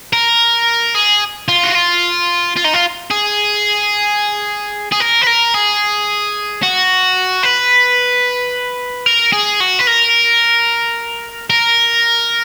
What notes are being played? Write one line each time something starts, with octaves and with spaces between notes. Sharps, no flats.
A#4
G#4
F4
F#4
F4
F4
D#4
F4
G#4
G#4
A#4
B4
A#4
G#4
F#4
B4
A#4
G#4
F#4
B4
A#4
A#4